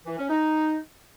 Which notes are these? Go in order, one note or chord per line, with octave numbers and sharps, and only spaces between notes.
E3
C#4
D#4